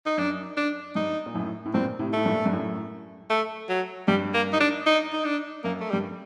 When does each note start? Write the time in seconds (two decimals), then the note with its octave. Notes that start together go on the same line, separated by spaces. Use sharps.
0.06 D#4
0.18 F#2 D4
0.57 D4
0.95 G2 D#4
1.26 A#2
1.34 F#2 A2
1.65 A2
1.74 G2 A#2 C4
1.99 A2 C3
2.13 A2 A3
2.26 G2 A#2
2.46 G2
2.52 F#2 A2
3.30 A3
3.69 F#3
4.07 G2 G3
4.34 A#3
4.53 D#4
4.60 D4
4.86 D#4
5.13 D#4
5.25 D4
5.64 F#2 A#3
5.80 A3
5.90 G3
5.93 G2